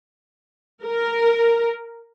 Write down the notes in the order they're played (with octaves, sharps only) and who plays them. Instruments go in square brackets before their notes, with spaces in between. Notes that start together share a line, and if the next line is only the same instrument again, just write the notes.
[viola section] A#4